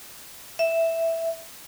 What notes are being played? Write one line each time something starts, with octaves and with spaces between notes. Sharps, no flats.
E5